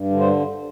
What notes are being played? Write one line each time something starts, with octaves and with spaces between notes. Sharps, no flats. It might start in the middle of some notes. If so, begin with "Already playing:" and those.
Already playing: G2
D3
C5